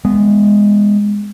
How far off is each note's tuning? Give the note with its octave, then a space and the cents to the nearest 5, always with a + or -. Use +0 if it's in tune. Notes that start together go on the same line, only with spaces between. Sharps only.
G#3 -15 B3 +0